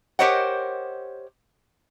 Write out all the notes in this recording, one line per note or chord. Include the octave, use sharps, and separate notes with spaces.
G4 A#4 C5 C#5 D#5 F#5